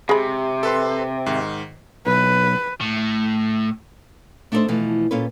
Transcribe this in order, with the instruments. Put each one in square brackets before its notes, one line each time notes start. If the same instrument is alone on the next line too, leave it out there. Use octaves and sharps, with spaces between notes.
[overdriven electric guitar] C3 [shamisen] G#3 B5
[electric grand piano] A4 B4 C6
G#2 D#3
[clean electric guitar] B1 [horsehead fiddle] B4
[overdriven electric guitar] A2
[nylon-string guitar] A3 D4 D#4 F#4 A4 C5
B2 E3 F3 A3
A#2 C#4 F4 A4 B4